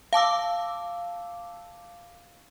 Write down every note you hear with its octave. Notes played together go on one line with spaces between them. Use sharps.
F5 A5 D6 E6